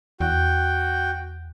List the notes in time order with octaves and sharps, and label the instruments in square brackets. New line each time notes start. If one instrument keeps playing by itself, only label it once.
[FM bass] E2 [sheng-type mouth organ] F#4 G5